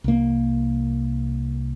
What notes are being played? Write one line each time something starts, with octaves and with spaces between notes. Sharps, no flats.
C2 A#3